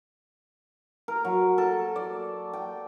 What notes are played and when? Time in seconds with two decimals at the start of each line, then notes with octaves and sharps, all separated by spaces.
1.08 A#4
1.25 F#3
1.58 A4
1.96 D5
2.54 G5